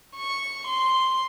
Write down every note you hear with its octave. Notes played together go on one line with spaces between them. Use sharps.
C#6
C6